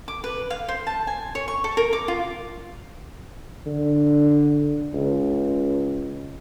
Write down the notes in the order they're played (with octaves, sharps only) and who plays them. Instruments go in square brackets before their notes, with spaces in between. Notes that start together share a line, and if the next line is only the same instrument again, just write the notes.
[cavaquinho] D6
B4
F5
C5
A5
G#5
C#5
C#6
A4
A#4
D6
F4
[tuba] D3
C#2